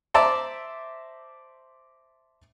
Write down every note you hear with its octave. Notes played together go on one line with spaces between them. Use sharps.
C5 D5 E5 A5 A#5 D6